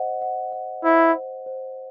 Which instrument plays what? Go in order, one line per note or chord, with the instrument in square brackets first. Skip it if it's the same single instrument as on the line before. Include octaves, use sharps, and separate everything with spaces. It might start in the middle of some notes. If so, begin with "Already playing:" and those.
Already playing: [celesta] C5 D#5 F#5
F#5
F#5
[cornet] E4 [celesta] C5
[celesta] C5
C5